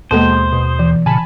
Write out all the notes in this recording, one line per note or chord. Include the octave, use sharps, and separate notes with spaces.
D#2 B2 G#3 A#3 A4 C5 A5
B2
E3
A#2 C#3 G#5 A5 B5